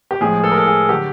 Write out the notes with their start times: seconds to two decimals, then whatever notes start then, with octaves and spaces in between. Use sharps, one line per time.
0.11 G4
0.21 A2 F3 G#3 G#4
0.43 A4
0.51 A#4
0.58 A4
0.67 G#4
0.89 D3 F#3 G4